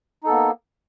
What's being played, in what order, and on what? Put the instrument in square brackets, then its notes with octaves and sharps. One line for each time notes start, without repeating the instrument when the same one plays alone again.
[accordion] D#4
A4
B3
A#3